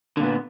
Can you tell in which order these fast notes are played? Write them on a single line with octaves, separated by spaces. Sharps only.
D3 A#2 B3